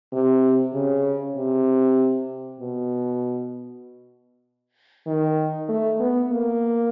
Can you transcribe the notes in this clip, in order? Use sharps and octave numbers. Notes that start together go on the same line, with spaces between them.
C3
C#3
C3
B2
D#3
A3
B3
A#3